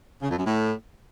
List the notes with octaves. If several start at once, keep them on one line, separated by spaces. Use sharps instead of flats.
C#3
F2
F#2
A2